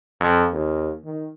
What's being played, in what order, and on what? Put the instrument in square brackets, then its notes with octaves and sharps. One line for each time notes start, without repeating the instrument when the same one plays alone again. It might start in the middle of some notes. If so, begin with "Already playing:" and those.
[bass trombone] F2
D#2
D#3